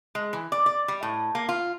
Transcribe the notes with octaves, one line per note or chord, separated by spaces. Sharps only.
G#3
E3
D5
D5
G3
A2
A#3
F4